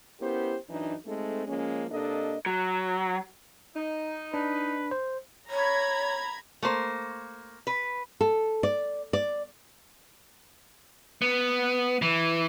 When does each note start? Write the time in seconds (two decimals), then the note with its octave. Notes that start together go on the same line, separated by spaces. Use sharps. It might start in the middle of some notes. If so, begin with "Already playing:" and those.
0.21 B3 C#4 E4 G4 A#4 C5
0.69 F#2 E3 D4 D#4
1.06 G#3 A3 C4 D#4 A4
1.47 F3 G#3 A#3 C#4
1.91 C3 A#3 D4 A4 D#5
2.46 F#3
3.76 D#4
4.34 D4 B4
4.91 C5
5.50 C#5 A#5 B5 G#6
6.62 A3 A#3 C5
7.67 B4
8.21 A4
8.63 D5
9.13 D5
11.22 B3
12.02 E3